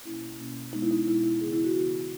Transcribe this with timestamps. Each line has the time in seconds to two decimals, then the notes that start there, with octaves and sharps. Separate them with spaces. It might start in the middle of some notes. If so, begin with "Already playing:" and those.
0.05 B2 A#3 C#4 E4
0.39 B2 A#3 C#4
0.73 B2 G#3 B3 D#4
0.82 E4
0.91 D#4
1.07 B2 G#3 B3 E4
1.24 E4
1.41 C#3 E3 B3 G#4
1.53 E4
1.64 F#4
1.75 C#3 E3 B3 F#4